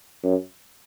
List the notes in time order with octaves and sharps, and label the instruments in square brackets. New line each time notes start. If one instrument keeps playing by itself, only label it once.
[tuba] F#2